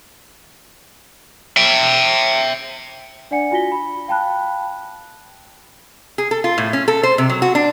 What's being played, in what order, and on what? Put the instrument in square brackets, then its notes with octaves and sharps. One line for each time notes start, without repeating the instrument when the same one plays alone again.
[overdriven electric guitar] E5 G5
[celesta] D4 D5 F#5 G#5 C#7
F4 F#4 G#5 A#6 B6 G7
B5
F5 G5 A5 B5 F#6
[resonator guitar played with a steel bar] G#4
A4
F4
A2
C#4
A4
C5
C3
F#3
F#4
D4